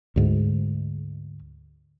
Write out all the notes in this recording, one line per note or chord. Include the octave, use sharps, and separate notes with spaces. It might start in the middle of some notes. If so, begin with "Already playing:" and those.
D2 G#2